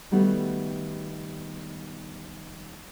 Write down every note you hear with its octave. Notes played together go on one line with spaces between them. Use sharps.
D#3 G3 A3 B3 F#4